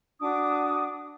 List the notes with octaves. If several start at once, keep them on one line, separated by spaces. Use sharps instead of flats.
D4 F#4 D6 D#6